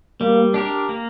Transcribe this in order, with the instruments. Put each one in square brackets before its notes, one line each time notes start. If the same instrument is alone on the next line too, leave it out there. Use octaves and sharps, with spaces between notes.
[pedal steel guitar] G3 [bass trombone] A#3
[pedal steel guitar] D4 G4 A#4
A#3